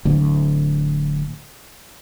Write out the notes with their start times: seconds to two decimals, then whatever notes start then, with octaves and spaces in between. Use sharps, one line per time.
0.05 D1 D2